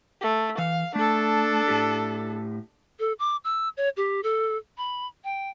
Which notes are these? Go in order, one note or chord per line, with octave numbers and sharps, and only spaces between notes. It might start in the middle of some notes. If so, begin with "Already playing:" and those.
A3
E3 F5
A3 D4 A4
A2 G4
A4
D6
E6
C#5
G4
A4
B5
G5